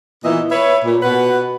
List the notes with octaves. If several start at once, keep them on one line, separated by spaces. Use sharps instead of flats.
A#2 D#3 E3 B3 D#5 E5
B4 C#5 E5
A#2
B2 B4 F#5